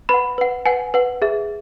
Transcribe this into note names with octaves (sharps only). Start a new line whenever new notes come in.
B4 F#5 B5
B4 F#5
B4 F#5 G#5
B4 F#5
G#4 E5